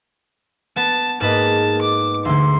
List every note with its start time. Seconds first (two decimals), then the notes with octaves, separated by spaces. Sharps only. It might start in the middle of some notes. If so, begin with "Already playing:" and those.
0.76 B3 A5
1.21 G#2 A#3 B4 D#5 A5
1.82 D6
2.25 D2 D3 C6